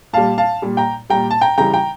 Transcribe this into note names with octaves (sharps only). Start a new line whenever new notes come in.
A#2 G3 F5 A5
F5 A5
A#2 G3
G5 A#5
A#2 G3 G5 A#5
A5
G5 A#5
C#3 E3 G3 G5 A#5
G5 A#5